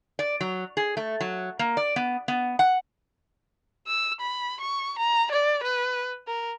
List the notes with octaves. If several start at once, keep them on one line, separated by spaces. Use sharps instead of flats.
D5
F#3
G#4
A3
F#3
A#3
D5
B3
B3
F#5
E6
B5
C#6
A#5
D5
B4
A#4